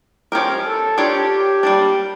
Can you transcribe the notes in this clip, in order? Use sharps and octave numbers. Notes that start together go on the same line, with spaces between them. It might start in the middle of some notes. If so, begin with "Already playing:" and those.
F3 C#4 G4 A#4
A4
D4 F4 G4 A#4 C#5
G3 A#3 D4